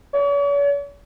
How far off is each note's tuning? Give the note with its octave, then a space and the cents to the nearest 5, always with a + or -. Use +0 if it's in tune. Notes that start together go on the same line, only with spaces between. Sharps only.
C#5 +45